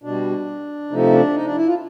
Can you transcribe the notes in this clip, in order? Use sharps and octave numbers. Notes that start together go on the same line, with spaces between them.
B2 G3 D4
C3 F3 A3 D#4
D4
D#4
D4
E4
F4